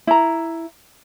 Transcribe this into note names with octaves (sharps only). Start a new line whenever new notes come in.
E4 A#5